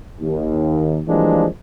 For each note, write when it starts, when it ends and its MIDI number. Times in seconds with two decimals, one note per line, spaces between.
0.20 1.00 39
1.07 1.46 52
1.07 1.46 53
1.07 1.46 55
1.07 1.46 56
1.07 1.46 58
1.07 1.46 62